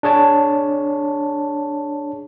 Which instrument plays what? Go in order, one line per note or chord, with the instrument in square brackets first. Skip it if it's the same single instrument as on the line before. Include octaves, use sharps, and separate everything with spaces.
[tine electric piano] D4 G#4 C#5 A5